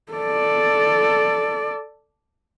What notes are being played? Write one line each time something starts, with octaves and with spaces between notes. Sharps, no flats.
A4 D5